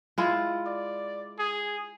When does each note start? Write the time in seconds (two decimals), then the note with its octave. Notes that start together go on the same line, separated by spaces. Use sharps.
0.18 G#3 E4 F4
0.66 D5
1.39 G#4